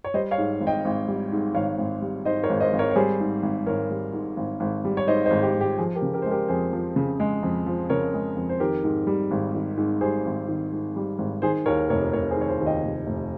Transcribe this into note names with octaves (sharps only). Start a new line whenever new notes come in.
C#5
G3 C5 D#5
C#5 F5
G#2
G#1
D#5 G5
G#1
G3
G#2
G#1 C#5 F5
G#1
G3
G#2 C5 D#5
A#4 C#5
G#1
C5 D#5
G#1
A#4 C#5
C#5
G3 G#4 C5
G#2
G#1
G#1 A#4 C#5
G3
G#2
G#1
G#1
G3
C#5
G#2 C5 D#5
C5 D#5
G#1
G4
G#1
G4
F3 G#4
G4 A#4
C#3
G4 A#4
C5
G#3
G4 A#4
F2 G#4 C5
F3
C#3
G#3
F2
F3
C#3 A#4 C#5
G#3
F2
C5
D#3 G4 A#4
G#2
G3
G#1
D#3
G#2
G3 G#4 C5
G#1
D#3
G#2
G3
G#1
D#3 G#4 C5
D#2 A#4 C#5
F1 A#4 C#5
F1 A#4 C#5
G#4 C5
D#3 C#5
G#4 C5
D#2
D#5 G5
F1
F1